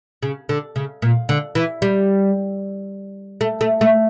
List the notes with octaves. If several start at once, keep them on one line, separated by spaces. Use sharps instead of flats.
C#3
D3
C#3
A#2
D3
E3
G3
A3
A3
A3